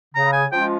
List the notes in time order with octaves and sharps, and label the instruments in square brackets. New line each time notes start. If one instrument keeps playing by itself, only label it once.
[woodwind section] C#3 [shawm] A#5
[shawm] G#5
[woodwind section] F3 G#3 C#4 F4 [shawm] G5